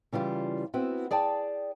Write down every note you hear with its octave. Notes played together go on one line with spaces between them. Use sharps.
C#3 E3 G3 F4
B3 C4 E4 F#4
G#4 D5 G5 A5